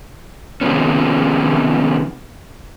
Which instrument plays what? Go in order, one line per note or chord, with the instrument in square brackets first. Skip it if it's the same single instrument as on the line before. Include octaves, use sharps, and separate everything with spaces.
[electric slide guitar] C3 D#3 F3 G#3 B3 C#4